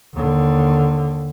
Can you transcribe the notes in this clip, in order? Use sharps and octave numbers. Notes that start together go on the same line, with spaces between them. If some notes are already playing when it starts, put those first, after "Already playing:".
D#2 D3